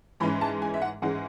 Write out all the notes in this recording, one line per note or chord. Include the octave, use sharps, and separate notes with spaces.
G#2 E3 G#3 C#4 B5
A5
G#5
E5
F#5
G#2 E3 G#3 C#4 F#5